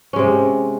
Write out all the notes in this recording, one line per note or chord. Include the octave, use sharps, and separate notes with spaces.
C3 G#3 C#4